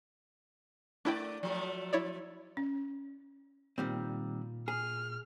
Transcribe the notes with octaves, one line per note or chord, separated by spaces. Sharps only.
A3 D4 E4 D5 G5
F3 F#3 A3
E4 C#5 D5
C#4
A#2 D#3 G3 C4
G#4 F6